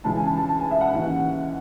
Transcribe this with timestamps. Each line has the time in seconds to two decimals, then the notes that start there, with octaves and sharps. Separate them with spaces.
0.04 C#2 C#3 E3 A5
0.16 G#5
0.26 A5
0.37 A5
0.49 A5
0.59 G#5
0.71 E5
0.81 F#5
0.93 D#2 C#3 E3